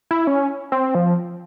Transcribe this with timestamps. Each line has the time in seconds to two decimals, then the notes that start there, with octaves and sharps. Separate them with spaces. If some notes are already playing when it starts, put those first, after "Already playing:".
0.11 E4
0.27 C#4
0.72 C4
0.95 F3